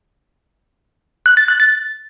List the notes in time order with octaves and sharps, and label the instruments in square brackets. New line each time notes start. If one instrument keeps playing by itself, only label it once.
[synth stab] F#6
A6
F#6
A6